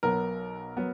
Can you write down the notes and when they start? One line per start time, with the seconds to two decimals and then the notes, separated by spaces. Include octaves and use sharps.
0.03 B1 B2 F#3 B3 A#4
0.77 F#3 B3